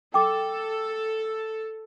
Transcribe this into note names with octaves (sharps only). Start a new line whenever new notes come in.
A4 G5 D6